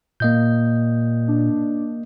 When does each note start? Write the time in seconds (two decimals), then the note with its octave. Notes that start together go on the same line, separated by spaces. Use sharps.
0.20 A#2 A#3 D#5 G6
1.28 D4